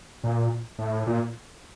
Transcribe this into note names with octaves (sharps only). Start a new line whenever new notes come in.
A#2
A2
A#2